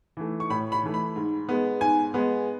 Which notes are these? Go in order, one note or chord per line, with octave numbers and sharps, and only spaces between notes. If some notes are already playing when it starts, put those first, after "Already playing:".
E3 A3
C#6
A2 B5
B5
E3 A3
B5
G#2
G#3 B3
G#2 G#5
G#3 B3